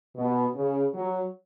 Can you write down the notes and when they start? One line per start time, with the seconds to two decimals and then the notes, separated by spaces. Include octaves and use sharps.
0.16 B2
0.55 C#3
0.94 F#3